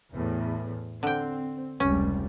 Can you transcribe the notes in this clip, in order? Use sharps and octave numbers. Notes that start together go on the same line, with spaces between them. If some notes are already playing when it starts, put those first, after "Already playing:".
E2 A2
D3 C4 G5
F1 C#2 G3 C#4